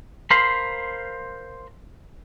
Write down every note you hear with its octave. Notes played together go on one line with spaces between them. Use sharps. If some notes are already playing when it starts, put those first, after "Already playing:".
A#4 C5 F5 B5 C6